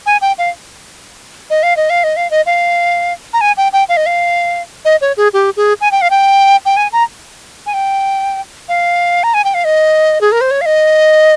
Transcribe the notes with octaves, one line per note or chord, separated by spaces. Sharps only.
G#5
G5
F5
D#5
F5
D#5
F5
D#5
F5
D#5
F5
A#5
G#5
G5
G5
F5
D#5
F5
D#5
C#5
G#4
G4
G#4
G#5
G5
F5
G5
G5
G#5
A#5
G#5
G5
F5
A#5
G#5
G5
F5
D#5
G#4
A#4
C5
C#5
F5
D#5